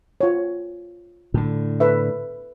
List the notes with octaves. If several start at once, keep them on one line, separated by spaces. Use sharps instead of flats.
F4 C#5
A2 D3
A4 B4 E5